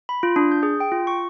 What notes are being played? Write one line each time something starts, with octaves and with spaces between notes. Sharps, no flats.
B5
F4
D4
G6
G#4
G5
F4
C#6